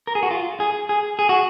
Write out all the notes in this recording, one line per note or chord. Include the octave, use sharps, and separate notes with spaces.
A#4
G#4
F#4
F4
G#4
G#4
G#4
F#4